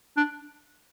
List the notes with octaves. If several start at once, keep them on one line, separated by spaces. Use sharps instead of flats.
D4